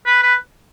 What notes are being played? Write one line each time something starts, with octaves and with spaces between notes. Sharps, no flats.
B4
B4